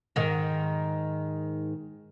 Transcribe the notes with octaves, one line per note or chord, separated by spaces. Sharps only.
G#2 D#3